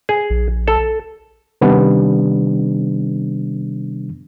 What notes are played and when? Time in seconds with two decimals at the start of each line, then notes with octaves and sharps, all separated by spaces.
0.09 G#4
0.30 A#1
0.68 A4
1.61 C3 D#3 G3 B3 D4